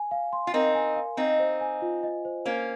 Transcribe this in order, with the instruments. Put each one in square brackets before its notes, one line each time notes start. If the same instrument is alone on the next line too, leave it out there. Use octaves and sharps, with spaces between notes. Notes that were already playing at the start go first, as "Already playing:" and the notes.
Already playing: [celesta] G#5
F5
C6
[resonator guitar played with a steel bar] F4
[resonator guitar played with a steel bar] C4 D#4 [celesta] A#4
[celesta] G#5
F5
[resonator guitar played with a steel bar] C4 D#4 [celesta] D#5
[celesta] C5
G#5
F4
D#5
C5
[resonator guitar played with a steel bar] A#3 C#4 [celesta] C5